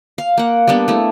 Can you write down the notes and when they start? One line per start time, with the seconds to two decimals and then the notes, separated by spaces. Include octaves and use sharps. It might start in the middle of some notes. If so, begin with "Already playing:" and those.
0.18 F5
0.38 A#3 F#5
0.67 G3 A#3 B3 D4
0.88 A3 E4